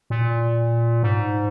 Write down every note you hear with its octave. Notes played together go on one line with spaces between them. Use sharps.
A#2
G#2